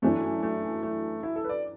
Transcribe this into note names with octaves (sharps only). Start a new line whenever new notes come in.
F#2 E3 A3 D4
A3
A3
E4
A4
B4
D5